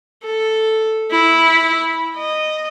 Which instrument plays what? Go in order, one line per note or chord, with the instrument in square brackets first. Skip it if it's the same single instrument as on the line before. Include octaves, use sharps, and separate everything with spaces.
[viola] A4
E4
D#5